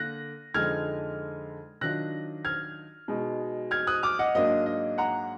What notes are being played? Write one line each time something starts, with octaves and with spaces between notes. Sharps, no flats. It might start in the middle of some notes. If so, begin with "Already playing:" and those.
Already playing: D3 A#3 F#6 A#6
F2 D3 G#3 D#4 F6 G#6
D#3 F#3 D4 F4 F#6 A#6
F6 G#6
B2 G#3 D#4
F6 G#6
D#6 F#6
D6 F6
D#5 F#5
G#2 F#3 A#3 D4 D#5
D#5
F#5 A#5